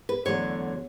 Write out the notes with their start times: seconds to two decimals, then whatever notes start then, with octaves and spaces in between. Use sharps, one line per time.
0.09 B4
0.25 E2 D3 F#3 A3 C#5